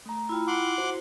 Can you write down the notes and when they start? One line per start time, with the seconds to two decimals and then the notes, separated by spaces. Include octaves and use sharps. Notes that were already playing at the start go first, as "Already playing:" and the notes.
0.06 A3 A#5
0.29 E4 F4 G5 B5
0.48 F#5 C6 D6
0.78 E4 F#4 C5